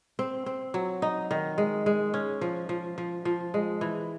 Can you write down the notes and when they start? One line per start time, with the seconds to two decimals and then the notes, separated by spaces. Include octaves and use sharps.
0.19 C4
0.46 C4
0.74 F#3
1.02 D#4
1.31 D#3
1.58 G#3
1.86 G#3
2.14 C#4
2.41 F3
2.69 F3
2.98 F3
3.25 F3
3.54 G#3
3.81 E3